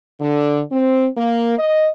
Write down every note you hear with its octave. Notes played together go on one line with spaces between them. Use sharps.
D3
C4
A#3
D#5